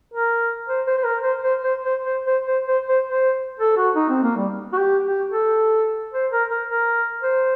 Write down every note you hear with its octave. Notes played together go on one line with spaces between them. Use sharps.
A#4
C5
C5
C5
A#4
C5
C5
C5
C5
C5
C5
C5
C5
C5
C5
A4
F#4
D#4
C4
A#3
G3
F#4
G4
G4
A4
C5
A#4
A#4
A#4
C5